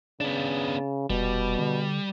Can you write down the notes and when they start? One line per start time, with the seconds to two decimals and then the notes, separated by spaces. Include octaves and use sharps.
0.21 C#3 B3 D4
1.10 F1 B2 G3
1.58 D3